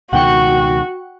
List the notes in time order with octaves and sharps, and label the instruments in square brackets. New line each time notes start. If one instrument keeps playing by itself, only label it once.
[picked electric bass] C#2 B2 D#3 [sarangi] F#4 [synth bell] F#5 G5 C#6